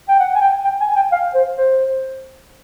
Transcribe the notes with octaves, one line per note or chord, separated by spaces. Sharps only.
G5
F#5
G#5
G5
G5
G#5
G#5
G5
F5
C5
C5